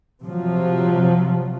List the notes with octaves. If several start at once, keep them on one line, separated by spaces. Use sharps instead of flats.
C3 F3 F#3